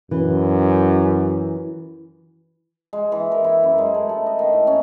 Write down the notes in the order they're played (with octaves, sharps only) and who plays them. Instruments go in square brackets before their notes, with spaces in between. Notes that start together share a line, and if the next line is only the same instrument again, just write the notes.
[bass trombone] F#2 [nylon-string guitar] E3
[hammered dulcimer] G#3
E3
A#4
E4
F#2
G#3
A3
A4
D#5
D#3
A2
C#4